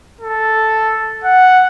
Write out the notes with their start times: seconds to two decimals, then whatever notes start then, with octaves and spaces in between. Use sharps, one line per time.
0.20 A4
1.24 F#5